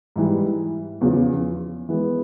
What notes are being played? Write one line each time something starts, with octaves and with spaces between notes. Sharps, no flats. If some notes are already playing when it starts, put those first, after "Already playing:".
G#2 E3 G3
E2 C#3 F3
E3 G#3 B3